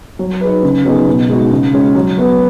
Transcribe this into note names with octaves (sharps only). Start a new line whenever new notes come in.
F#3
D#4 G#4 B4
C#3
F#3 B3 D#4 G#4
B2
G#3 D#4 F#4
C#3
G#3 C#4
F#3
B3 F#4 B4